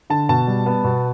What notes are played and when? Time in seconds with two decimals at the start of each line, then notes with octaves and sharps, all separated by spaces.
0.10 D3 A5
0.29 B2 A5
0.48 G3
0.66 B3
0.84 B2